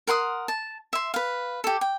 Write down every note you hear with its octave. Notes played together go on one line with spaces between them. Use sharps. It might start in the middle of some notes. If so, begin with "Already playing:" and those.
A#4 F#5 C6 D#6
A5
E5 C6
B4 F5
G4 A4
G5